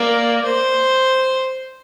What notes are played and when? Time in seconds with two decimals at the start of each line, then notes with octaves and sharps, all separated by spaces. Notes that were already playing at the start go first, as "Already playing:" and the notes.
Already playing: A#3 D5
0.44 C5